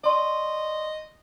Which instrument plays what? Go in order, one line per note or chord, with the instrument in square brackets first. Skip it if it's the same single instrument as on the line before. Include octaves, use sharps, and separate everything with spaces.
[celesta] D5 C6 C#6 [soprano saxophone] D#5